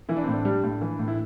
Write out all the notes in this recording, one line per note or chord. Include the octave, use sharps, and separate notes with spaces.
E3 E4
D4
C4
A2 D4
G3
A2
E3
A2
E4